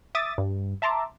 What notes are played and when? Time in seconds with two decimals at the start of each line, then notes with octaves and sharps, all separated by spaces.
0.15 E5 D6 D#6 A6
0.38 G2
0.82 E5 A5 A#5 C6 D6